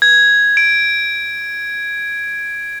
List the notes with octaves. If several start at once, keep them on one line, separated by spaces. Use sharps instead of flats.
G#6
D7